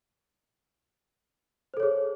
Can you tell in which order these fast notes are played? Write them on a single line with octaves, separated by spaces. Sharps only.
C5 A4 C#5 G#4